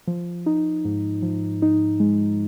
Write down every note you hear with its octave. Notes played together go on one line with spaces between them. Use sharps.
F3
D#4
G#2
F3
D#4
G#3